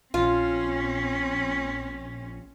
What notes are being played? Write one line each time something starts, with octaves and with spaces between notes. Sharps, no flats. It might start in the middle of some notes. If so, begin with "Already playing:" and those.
A#1 C4 C#4 F4